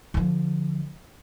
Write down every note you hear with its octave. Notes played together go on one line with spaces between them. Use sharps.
D3 F3